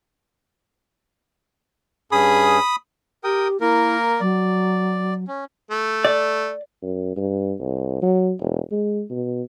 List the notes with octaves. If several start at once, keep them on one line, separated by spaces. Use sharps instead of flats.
G2 C#4 G#4 B5 D#6
G4 A#4 G5 D#6
A#3 E4 A#4
F#3 D5
C#4
A3
D5
F#2
G2
C2
F#3
E1
G#3
B2